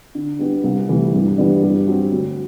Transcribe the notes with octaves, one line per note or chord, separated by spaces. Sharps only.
D3
G3 B3 D4 G4
C2
C3 E3 A3
G2
E3 G3 B3 D4
G2
F#3 C4
D2